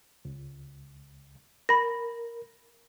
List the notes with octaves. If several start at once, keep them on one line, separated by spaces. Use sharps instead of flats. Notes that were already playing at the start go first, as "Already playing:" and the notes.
C#2
A#4 B5 A#6